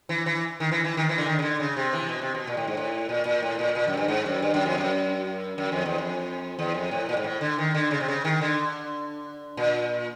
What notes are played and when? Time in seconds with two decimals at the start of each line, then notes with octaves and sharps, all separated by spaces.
0.09 E3
0.26 E3
0.60 D#3
0.71 E3
0.84 E3
0.97 D#3
1.09 E3
1.18 D3
1.26 D#3
1.39 C#3
1.42 D3
1.60 C#3
1.77 C3
1.93 E3
2.03 C3
2.09 B2
2.22 C3
2.34 B2
2.47 A#2
2.57 A2
2.67 G#2
2.77 A2
3.09 A#2
3.25 A#2
3.42 A2
3.59 A#2
3.75 A#2
3.87 F#2
3.97 G2
4.08 G#2
4.26 F#2
4.42 G2
4.54 F#2
4.66 F2
4.78 F#2
5.58 F#2
5.72 F2
5.86 E2
5.98 F2
6.59 E2
6.74 F2
6.91 A2
7.09 A#2
7.17 G#2
7.24 A2
7.41 D3
7.58 D#3
7.74 D3
7.91 C#3
8.01 C3
8.08 C#3
8.25 D#3
8.41 D3
9.57 A#2